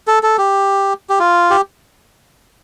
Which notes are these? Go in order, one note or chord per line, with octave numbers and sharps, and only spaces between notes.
A4
A4
G4
G4
F4
G4